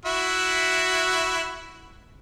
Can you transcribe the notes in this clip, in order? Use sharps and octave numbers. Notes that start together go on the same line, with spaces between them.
E4 F#4 E5